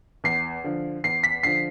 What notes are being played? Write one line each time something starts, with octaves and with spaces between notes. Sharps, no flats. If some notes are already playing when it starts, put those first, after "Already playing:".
E2 C7
D3 F3
E2 C7
B6
D3 F3 C7